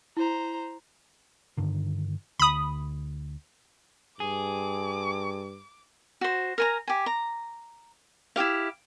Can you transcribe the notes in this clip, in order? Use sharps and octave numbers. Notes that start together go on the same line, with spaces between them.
E4 C5 A#5
G2 D3 D#3
D2 B5 D#6
G2 G#4 D6
F#4 C5
A#4 G#5 A#5
G4 G#5
A#5
E4 F#4 G4 F5